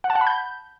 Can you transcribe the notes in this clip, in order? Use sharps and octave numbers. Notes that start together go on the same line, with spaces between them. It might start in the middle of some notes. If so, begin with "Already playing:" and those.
F#5
A5
F#5
B5
G6